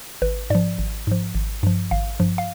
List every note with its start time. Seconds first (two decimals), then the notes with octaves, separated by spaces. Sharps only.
0.22 G#1 B4
0.50 G#2 F3 D5
0.79 G#1
1.07 G#2 F3
1.35 G#1
1.63 G2 F3
1.91 G#1 F5
2.20 G2 F3
2.38 F5